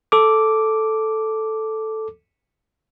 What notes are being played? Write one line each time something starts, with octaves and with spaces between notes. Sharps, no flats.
A4 D6